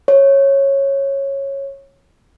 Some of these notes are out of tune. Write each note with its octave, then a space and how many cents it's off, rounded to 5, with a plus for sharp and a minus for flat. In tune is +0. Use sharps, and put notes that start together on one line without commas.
C#5 -10